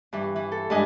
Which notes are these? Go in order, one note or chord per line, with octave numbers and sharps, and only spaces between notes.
G2 E3
E3
A4
G2 G#3 D4 B4 D#5 G#5